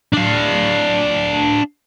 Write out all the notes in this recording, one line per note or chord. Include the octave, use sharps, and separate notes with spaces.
D4 F5